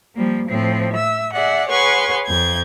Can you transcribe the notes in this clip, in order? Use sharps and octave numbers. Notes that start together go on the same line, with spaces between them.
F3 G3 A#3
A2 F3 C4
E5 E6
G#4 D5 E5 F#5
G#4 B4 C#5 F#5 C6 C#6
F2 G6 G#6